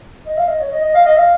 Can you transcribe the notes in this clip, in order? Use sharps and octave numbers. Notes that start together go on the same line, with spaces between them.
D#5
F5
D#5
C#5
D#5
D#5
F5
D#5
F5